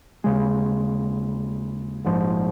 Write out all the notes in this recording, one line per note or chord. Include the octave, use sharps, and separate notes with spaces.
D#2 C#3 G#3
A#1 G#2 F3